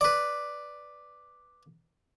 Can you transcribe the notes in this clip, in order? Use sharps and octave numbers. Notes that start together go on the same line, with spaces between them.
B4 D5